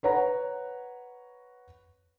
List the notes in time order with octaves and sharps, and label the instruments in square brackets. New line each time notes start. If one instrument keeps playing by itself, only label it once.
[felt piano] B4 C#5 F#5 A#5